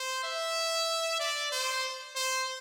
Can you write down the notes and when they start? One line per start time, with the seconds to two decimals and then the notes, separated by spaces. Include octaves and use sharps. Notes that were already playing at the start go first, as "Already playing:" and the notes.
Already playing: C5
0.24 E5
1.20 D5
1.52 C5
2.15 C5